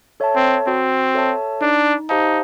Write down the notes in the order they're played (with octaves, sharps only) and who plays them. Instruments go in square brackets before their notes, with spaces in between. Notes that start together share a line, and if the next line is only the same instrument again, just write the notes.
[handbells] A4 C#5 E5 A5
[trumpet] C4
[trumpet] C4 [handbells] F#4
[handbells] A4 C#5 E5 A5
[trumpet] D4 [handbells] D#4
[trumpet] D#4 [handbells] G4 C5 F5 A5